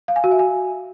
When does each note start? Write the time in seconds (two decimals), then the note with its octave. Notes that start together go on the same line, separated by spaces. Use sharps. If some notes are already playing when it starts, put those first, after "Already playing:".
0.08 F5
0.16 G#5
0.24 F#4
0.32 E5
0.39 G#5